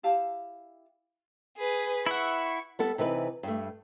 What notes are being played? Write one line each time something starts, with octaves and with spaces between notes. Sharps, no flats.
E4 G4 F5 A5
G#4 B4
E4 E5 F#5 C#6
G3 B3 A4
C3 E3 D#4 B4
G2 A3